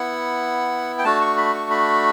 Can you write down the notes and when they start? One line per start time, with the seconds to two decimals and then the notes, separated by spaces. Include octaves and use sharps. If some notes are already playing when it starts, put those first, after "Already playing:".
Already playing: B3 E4 F#5
0.99 G5
1.04 A3 D4 F#4 A5
1.21 C#6
1.38 B5
1.54 C#6
1.70 B5